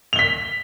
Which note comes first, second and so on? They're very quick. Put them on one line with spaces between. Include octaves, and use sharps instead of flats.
F7 G7 B6